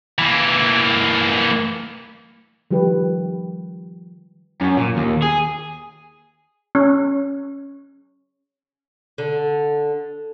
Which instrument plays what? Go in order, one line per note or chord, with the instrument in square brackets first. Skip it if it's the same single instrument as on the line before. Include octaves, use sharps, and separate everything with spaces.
[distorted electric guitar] E3 A#3
[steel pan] D#3 F3 G3 G4 B4
[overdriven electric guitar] F#2
A#2
D#2
G#4
[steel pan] C#4
[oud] D3